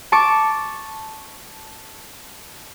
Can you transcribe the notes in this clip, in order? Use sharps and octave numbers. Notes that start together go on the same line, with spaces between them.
A5 C#6 D6